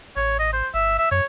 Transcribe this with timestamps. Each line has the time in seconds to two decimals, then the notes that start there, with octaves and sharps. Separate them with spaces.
0.17 A1 C#5
0.39 D#5
0.53 C5
0.74 G1 E5
0.99 E5
1.11 F#2 C#5